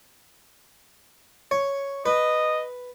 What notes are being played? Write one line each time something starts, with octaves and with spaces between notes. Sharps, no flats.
C#5
B4 D#5